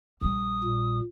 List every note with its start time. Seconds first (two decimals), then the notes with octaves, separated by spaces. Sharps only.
0.21 A#1 G3 D#6
0.64 A#2